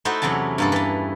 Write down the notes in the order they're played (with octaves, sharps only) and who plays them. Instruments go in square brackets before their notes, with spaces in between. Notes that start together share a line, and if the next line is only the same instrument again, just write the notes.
[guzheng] A3 D#4 E4 F#4 A4 C5
E2 C3 F#3 C#4 A5
G2 A#3 A4
E3 A5